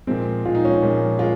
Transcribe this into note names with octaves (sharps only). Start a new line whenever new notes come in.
A#2 F3 G#3 C4
A#2 F3 G#3 F4
D#4
C#4
D#4
A#2 F3 G#3
G#3 F4